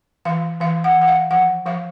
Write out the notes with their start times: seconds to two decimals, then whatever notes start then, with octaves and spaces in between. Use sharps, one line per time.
0.25 E3 F5
0.60 E3 F5
0.84 F#5
0.96 E3
1.01 F#5
1.08 F5
1.31 F3 F#5
1.65 F3 F5